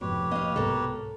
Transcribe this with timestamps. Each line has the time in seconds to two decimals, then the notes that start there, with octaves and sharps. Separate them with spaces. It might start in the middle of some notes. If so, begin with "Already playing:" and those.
0.01 F1 F2 G#2 B2 G4 B4 C#5
0.31 B2 A#3 D#5 F5 F#6
0.56 C2 G#2 B2 F#3 G#3 A4 A#4